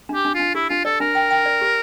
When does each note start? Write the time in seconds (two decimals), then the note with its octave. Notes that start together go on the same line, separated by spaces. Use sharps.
0.09 D4
0.15 G4
0.25 D4
0.34 F4
0.40 D4
0.55 E4 G4
0.70 D4 F4
0.85 A4 D5
1.00 D4 A#4
1.15 G5
1.30 G5
1.46 D5
1.61 G4